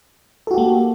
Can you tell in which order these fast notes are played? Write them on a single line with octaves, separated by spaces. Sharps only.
A4 F#4 G4 A#3